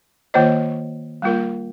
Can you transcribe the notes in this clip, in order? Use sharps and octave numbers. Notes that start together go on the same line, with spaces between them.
D#3 A#3 F4 C5 D#5
G3 A#3 F4 A#4